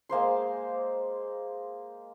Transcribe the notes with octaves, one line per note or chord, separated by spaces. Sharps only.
G#3 A#3 C5 C6